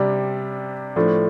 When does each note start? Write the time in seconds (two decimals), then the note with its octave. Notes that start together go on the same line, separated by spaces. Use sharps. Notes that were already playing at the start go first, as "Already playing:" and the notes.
Already playing: C3 G3 D4
0.96 A2 F3 A3 D4